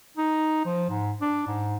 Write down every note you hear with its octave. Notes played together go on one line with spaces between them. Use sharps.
D#4
F3
G#2
D4
G#2